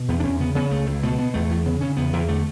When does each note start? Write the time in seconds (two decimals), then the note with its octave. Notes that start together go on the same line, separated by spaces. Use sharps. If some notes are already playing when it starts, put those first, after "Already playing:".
Already playing: B2
0.08 E2 B3
0.20 D4
0.24 E2 C#4
0.40 C#3 B3
0.55 C#3 B3
0.71 C#2 A3
0.86 C#2
1.03 B2 A3
1.18 B2 B3
1.34 E2 A3
1.49 E2
1.65 C#3 B3
1.81 C#3 C#4
1.97 E2 B3
2.13 E2
2.28 D3 A3